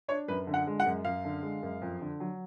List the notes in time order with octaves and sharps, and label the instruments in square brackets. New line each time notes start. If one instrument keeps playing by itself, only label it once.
[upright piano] D4 C#5
F#2 B4
D3
F#5
G#3
F#5
F#2
F#2 F5
D3
G#3
F#2
F2
D3
F#3